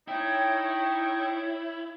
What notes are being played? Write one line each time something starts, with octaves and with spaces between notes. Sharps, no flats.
D#4 E4 C#5 G5